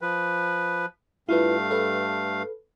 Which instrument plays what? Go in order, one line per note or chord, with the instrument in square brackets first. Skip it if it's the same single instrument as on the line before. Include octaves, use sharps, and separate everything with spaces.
[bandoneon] F3 B4
[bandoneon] G2 A3 F5 [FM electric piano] E4 F4 B4
[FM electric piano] A4 B4